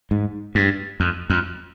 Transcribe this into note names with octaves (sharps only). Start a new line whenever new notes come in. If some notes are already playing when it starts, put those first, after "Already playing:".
G#2
G2
F2
F2